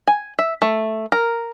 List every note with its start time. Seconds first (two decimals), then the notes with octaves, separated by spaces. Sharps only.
0.07 G#5
0.39 E5
0.62 A3
1.12 A#4